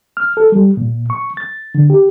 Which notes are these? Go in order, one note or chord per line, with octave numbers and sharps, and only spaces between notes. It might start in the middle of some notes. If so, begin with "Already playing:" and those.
F6
A4
G3
A#2
C#6
A6
D3
G4